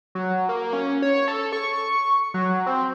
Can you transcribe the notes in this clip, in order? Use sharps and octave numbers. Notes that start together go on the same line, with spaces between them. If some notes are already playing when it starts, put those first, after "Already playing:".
F#3
A#3
C#4
C#5
A4
C#6
F#3
C4